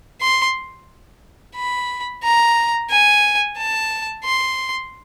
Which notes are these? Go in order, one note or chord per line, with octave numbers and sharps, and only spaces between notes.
C6
B5
A#5
G#5
A5
C6